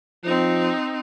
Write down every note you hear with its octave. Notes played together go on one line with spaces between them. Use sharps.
F3 C4 D#4